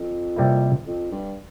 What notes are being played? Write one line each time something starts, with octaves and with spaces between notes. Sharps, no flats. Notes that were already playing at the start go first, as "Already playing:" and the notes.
Already playing: F2
C3 G3 A#3 E4
F2
G2